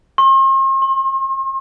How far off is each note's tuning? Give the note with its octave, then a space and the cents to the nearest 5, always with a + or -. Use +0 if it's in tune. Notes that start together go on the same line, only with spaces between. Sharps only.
C6 +45
C6 +25